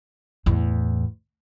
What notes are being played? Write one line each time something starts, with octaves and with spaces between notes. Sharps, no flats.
E2 A2